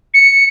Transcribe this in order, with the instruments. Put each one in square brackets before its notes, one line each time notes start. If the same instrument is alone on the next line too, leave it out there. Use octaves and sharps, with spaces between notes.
[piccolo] C#7